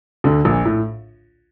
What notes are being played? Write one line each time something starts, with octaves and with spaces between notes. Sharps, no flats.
D2 D3
A#1 A#2
A2